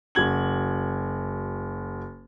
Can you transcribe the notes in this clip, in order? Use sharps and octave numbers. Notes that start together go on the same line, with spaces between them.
F#1 F#4 G#6 F#7